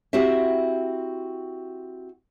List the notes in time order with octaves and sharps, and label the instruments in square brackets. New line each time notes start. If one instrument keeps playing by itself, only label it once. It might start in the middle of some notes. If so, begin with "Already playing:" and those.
[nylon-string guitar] C4 E4 F#4 G4 E5